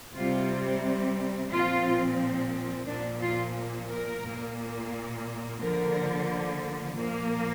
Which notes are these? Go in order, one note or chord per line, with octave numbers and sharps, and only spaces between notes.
C3 G3 C4 F4
A#2 F3 C4 F4
A#2 F3 A#3 D4
F4
A#4
A#2 A#3
D3 F3 A#3 A#4
A#2 F3 A#3